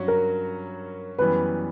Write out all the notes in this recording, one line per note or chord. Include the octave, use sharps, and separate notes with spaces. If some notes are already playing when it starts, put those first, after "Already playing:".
Already playing: G2 F#3 C#4 F#4
A#4
F#2 E3 G3 B3 B4